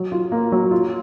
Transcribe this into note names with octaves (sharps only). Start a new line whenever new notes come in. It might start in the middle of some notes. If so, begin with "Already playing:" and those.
Already playing: F#3
F4
A#3
F#3
F4